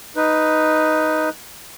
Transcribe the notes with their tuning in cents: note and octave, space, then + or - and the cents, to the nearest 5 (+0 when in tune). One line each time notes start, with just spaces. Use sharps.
D#4 +0 B4 +0